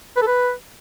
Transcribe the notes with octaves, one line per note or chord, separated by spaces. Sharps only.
B4
A4
B4